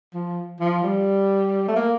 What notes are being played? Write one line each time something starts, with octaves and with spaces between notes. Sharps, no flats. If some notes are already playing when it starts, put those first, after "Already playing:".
F3
F3
G3
A3
A#3